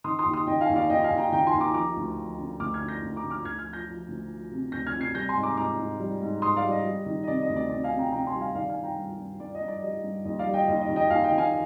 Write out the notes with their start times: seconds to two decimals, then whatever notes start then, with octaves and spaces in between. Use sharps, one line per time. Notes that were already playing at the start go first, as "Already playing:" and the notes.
0.04 D#3 C6 D#6
0.19 C6 D#6
0.25 D#2
0.33 C6 D#6
0.47 D#3 D#5 G5
0.61 F5 G#5
0.69 D#2
0.76 D5 F5
0.89 D#2 D#5 G5
1.04 F5 G#5
1.11 D#2
1.18 G5 A#5
1.32 D#3 G5 A#5
1.47 G#5 C6
1.53 D#2
1.61 A#5 D6
1.74 F3 A#5 D6
1.96 D2
2.17 F3
2.39 D3
2.60 D2 D6 F6
2.74 F6 G#6
2.81 D3
2.88 G6 A#6
3.02 D2
3.16 A#5 D6
3.24 D2
3.30 D6 F6
3.44 D2 F6 G#6
3.58 F6 G#6
3.66 F3
3.73 G6 A#6
3.87 F3
4.08 D2
4.30 F3
4.51 C3
4.72 D2 G6 A#6
4.86 F6 G#6
4.94 C3
5.01 G#6 C7
5.14 G3 G6 A#6
5.29 G#5 C6
5.36 G#2
5.43 A#5 D6
5.57 G#2 A#5 D6
5.79 G#2
6.00 G3
6.21 G#2
6.42 G#2 C6 D#6
6.56 D5 F5
6.64 G3
6.71 D#5
6.85 G3
7.06 D#3
7.23 D#5
7.27 C3 D5
7.41 D#5
7.49 D2
7.56 D5
7.70 C3 D5
7.84 F5 G#5
7.91 C3
7.98 G5 A#5
8.12 C3 G5 A#5
8.27 G#5 C6
8.34 G3
8.41 F5 G#5
8.55 D#3 D5 F5
8.69 F5 G#5
8.77 G2
8.83 G5 A#5
8.98 G2
9.19 G2
9.40 G2 D5
9.54 D#5
9.61 G2
9.68 D5
9.82 G3 D#5
10.04 G2
10.25 D#2 D#5
10.39 D5 F5
10.47 G3
10.53 D#5 G5
10.67 D#2 D#5
10.82 D#5
10.89 D#3
10.96 D#5 G5
11.10 D#2 F5 G#5
11.24 D#5 G5
11.31 D#3
11.38 F5 G#5